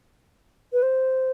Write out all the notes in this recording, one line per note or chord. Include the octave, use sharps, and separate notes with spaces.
B4
C5